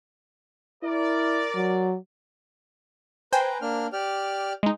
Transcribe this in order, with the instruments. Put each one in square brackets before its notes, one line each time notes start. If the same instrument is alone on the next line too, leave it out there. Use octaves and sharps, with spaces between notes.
[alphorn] E4 [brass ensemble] A#4 D5
[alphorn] F#3
[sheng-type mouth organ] B4 A#5 [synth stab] C5 G5 G#5
[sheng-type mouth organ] A#3 D4 F6
G4 D5 F6
[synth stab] G#3 D#4